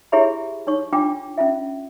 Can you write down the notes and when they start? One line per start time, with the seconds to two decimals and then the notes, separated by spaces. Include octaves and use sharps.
0.12 E4 G4 G#4 C#5 E5 B5
0.67 D#4 C#5 C#6
0.93 D4 F4 G5 D6
1.38 C#4 F4 E5